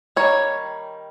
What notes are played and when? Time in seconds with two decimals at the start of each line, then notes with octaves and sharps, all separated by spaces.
0.16 D#3 G3 A#3 C#5